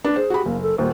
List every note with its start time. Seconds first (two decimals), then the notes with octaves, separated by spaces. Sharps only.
0.04 D4 B4
0.16 G#4 C5
0.30 F#4 G4 B5
0.45 F#1 A#3
0.62 A4
0.78 D#1 D#2 C5